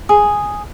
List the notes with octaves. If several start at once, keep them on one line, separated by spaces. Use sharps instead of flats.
G#4